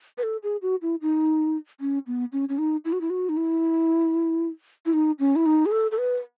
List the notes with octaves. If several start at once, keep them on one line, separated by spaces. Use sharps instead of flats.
B4
A4
G#4
F#4
E4
D#4
C#4
B3
C#4
C#4
D#4
E4
F#4
E4
F#4
D#4
E4
E4
D#4
C#4
E4
D#4
G#4
A4
A4
B4